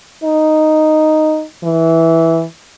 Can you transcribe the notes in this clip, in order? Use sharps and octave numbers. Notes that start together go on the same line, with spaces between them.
D#4
E3